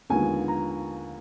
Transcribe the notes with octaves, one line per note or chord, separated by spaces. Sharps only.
D#2 D3 F3 G#3 B3 G#5
A#5